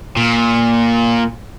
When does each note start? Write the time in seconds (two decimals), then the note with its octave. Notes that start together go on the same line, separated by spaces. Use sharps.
0.17 A#2